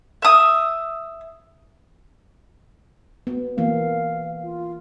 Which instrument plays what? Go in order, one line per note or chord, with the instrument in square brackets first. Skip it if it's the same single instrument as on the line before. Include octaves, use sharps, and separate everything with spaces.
[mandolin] E5 D#6
[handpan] B3
[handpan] E3 A#3 B3 [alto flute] F5
[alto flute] F4